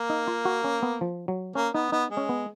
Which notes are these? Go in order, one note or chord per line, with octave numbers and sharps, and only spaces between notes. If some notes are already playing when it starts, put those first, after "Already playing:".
Already playing: A#3
D#4
F4
F#4
C#4
B3
F3
F#3
A#3 C#4
B3 D#4
B3 D#4
G#3
C#4
B3